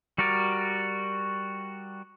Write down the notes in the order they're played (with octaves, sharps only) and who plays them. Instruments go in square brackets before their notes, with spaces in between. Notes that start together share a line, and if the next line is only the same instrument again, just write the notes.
[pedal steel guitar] G3 F#4 A#4 D5